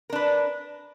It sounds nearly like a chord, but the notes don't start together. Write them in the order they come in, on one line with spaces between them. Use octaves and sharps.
A#4 D4 B4